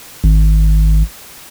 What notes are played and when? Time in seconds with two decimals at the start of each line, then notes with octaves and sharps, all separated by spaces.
0.24 G#1